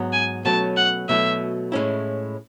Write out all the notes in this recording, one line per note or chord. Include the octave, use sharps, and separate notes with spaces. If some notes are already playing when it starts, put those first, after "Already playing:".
Already playing: G#2 F#3 B3
G#5
B2 F#3 A3 C#4 A5
F#5
B2 F#3 A3 E4 E5
A2 G#3 C#4 E4